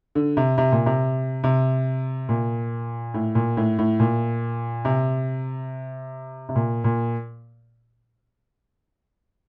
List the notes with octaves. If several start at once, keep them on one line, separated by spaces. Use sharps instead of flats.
D3
C3
C3
A#2
C3
C3
A#2
A2
A#2
A2
A2
A#2
C3
C3
A#2
A#2